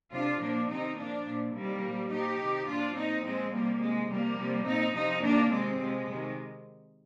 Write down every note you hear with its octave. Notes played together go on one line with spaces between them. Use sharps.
C3 F3 D4 F4
A#2 F3 A#3 D4
C3 D#3 C4 D#4
A#2 F3 A#3 D4
A#2 F3
C3 D#3 G3 A#3
A#2 F3
A#2 F3 D#4 G4
C3 D#3
A#2 F3 D4 F4
A#2 F3 C4 D#4
A#2 F3 G#3 C4
C3 F3 G3 A#3
C3 D#3 G#3
C3 F3 G3 A#3
C3 F3
A#2 F3 C4 D#4
C3 F3 C4 D#4
C3 D#3 A#3 D4
C3 D#3 G#3 C4
C3 F3 G#3
C3 D#3